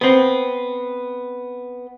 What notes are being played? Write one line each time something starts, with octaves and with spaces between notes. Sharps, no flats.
B3 C4